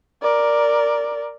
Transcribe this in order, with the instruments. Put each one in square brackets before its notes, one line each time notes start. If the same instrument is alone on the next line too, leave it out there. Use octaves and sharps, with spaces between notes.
[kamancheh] A#4 D5